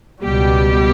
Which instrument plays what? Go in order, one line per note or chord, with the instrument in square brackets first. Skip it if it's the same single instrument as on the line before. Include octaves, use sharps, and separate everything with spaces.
[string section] C#2 B2 G3 G4